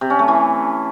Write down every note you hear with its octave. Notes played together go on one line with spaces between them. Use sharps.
C3
C#4
A3
E3